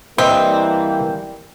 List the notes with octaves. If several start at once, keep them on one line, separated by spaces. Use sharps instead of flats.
E3 G3 A#3 C4 B4 D#5 E5